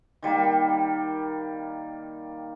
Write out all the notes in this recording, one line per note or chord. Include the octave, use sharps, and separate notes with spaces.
D#3 G3 A#3